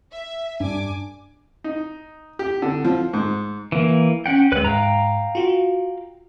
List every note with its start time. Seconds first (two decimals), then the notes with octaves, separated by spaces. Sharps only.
0.12 E5
0.60 G2 D4 G#5 D6
1.64 D#4
2.39 G4
2.62 D3
2.85 F3
3.13 G#2
3.72 E3 A#3
4.26 C#4 F#5 G5
4.52 D#2 G#3 B4 F#6
4.64 G#2 F5 G5 A#5
5.35 F4 F#4